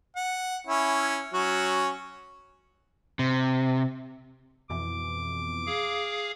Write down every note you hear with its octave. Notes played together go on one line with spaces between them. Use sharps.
F#5
C#4 E4
F#3 C#4 F#4
C3
F2 B2 E3 D6
G#4 F5